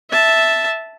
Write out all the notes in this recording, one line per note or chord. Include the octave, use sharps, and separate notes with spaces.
E5 A5